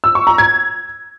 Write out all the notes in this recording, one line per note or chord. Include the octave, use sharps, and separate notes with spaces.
E6
C#6
A#5
G#6